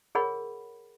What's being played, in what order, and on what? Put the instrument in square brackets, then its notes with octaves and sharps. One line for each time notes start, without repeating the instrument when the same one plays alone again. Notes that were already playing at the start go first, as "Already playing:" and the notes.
[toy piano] G#4 A#4 C#5 F#5 B5